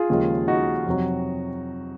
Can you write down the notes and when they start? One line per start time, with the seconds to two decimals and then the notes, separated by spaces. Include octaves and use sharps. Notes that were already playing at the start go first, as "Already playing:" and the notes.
Already playing: F4 G#4
0.10 D#2 C#3 F3 G#3
0.48 D#4 F#4
0.86 F2 C3 F#3